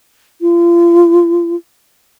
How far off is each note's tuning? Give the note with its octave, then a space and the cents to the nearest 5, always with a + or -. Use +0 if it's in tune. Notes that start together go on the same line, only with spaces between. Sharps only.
F4 -35